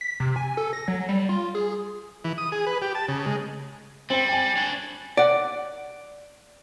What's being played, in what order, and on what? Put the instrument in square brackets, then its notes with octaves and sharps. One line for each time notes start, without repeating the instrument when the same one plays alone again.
[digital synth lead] B6
C3
G#5
A4
A#6
F#3
G3
F4
G#4
[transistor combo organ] E3
D#6
G#4
B4
G4
A5
C#3
G#3
[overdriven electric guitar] G3 [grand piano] C4 G5
[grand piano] G5 G#5
[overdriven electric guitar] D4 C#5
[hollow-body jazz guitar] D5 F#5